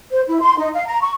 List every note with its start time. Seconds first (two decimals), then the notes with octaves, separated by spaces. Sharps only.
0.11 C5
0.27 E4
0.41 C6
0.57 D#4
0.73 F5
0.86 A#5
1.01 C#6